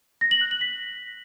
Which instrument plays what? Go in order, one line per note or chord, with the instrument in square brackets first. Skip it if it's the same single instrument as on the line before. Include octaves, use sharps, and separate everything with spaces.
[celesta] A#6
F#7
F#6
F#7
B6